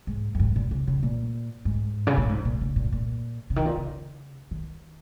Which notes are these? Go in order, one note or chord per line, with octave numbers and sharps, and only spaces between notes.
G#2
F2
G#2
A#2
C#3
C#3
A#2
G#2
C#3
A#2
G#2
A#2
C#3
A#2
A#2
C#3
D#3
A#2
C#3
D#3